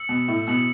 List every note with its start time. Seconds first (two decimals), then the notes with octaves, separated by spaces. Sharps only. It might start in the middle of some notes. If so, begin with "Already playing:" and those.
Already playing: E6 C#7 F#7
0.09 B2
0.28 A2
0.47 B2 E6 C#7 F#7